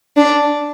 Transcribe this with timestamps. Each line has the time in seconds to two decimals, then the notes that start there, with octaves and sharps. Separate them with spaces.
0.17 D4